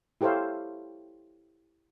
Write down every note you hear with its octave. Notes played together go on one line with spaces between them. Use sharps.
E4 G4 A4 C5 C#5 F5